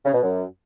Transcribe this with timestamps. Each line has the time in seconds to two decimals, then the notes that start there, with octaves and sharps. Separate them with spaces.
0.06 C#3
0.14 B2
0.23 F#2